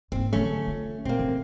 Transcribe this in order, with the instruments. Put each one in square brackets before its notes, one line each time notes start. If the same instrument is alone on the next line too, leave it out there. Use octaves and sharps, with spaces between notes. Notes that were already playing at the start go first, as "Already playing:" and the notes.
[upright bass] G#2 A#3 [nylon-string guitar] C4
[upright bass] D3 F#3 [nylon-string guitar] A3 C#4
[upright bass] F4
[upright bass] A#2 [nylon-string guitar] A#3 C4
[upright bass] D3